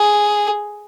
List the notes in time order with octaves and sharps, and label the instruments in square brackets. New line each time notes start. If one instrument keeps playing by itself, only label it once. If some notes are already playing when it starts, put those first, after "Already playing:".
Already playing: [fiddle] G#4